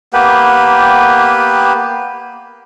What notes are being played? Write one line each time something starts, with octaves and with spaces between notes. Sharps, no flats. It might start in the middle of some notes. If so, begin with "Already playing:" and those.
A#3 B3 G4 B4